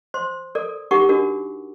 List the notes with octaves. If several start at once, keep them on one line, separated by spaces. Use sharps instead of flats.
C5 C6
A4 A#4 D5
D#4 G4 A#4 F#5 C#6 D6
D4 F#4 A#4